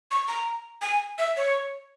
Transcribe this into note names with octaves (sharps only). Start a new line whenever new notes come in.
C#6
A#5
G#5
E5
C#5